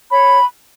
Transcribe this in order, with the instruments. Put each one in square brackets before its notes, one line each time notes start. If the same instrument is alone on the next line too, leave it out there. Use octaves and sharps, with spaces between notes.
[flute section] C#5 B5